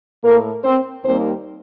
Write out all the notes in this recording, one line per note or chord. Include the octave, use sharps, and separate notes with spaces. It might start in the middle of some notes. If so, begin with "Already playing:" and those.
A2 A3 A#3 A#4
C4 C5
D#2 D#3 G3 A#3 C4 C5